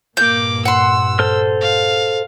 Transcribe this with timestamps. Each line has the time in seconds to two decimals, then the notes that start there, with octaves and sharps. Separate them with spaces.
0.17 G2 A#2 A#3 D6 G6
0.65 F#5 C6 E6
1.19 A4 C5 F6
1.60 F5